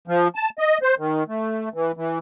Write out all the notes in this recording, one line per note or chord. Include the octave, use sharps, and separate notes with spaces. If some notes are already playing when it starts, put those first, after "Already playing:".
F3
A5
D#5
C5
D#3
A3
E3
E3